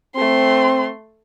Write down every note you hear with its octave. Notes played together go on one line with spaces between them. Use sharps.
A3 C4 C6